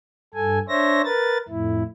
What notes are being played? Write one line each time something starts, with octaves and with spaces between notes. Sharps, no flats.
G2 A4 G#5
D4 C5 C#5 E5 A#6
A#4 B4 A6
F2 A2 E4